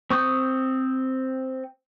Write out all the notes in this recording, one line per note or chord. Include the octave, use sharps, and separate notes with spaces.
C4 C#6 D#6 G6